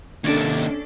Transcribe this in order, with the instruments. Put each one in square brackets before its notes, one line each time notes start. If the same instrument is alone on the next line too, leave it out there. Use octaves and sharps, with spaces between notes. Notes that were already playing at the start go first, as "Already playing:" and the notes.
[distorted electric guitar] D#2 C3 [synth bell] C#4 D4 A4